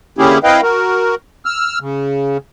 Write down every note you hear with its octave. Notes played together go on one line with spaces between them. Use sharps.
D3 A#3 C#4 E4 G4 G#4
C4 E4 B4 D#5 F5 G5
F#4 A#4
E6 F6
C#3